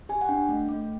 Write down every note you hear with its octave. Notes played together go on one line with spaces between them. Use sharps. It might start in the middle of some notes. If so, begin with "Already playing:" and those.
G4 G#5
F#5
D4 G5
A3
A3